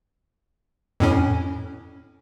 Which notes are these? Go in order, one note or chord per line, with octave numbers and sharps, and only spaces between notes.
F2 A2 C#4